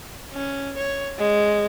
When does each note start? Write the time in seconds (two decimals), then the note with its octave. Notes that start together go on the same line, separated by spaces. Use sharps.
0.33 C#4
0.77 C#5
1.19 G#3